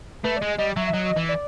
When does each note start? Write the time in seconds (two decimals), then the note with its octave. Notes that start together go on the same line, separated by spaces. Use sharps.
0.24 A3 B4
0.37 D5
0.41 G#3 D#5
0.58 G3 D#5
0.76 F#3 E5
0.87 E5
0.93 F#3 D#5
1.16 E3
1.29 D5